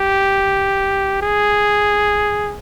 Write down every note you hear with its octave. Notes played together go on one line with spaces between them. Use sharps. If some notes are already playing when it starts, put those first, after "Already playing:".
Already playing: G4
G#4